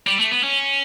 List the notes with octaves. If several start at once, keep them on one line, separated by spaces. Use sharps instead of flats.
G3
A3
B3
C#4